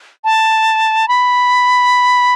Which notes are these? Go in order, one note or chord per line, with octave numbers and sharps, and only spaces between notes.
A5
B5